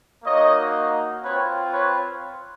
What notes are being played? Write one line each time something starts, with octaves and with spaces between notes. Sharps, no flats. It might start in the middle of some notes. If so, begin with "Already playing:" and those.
A#3 D#4 F#4 C#5 D#5
C4 F4 B4 C#5
B4 C#5